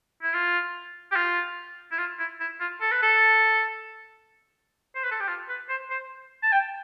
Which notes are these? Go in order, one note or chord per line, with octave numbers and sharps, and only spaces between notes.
E4
F4
G4
F4
E4
F4
E4
E4
F4
A4
B4
A4
C5
B4
A4
G4
F4
B4
C5
C5
A5
G5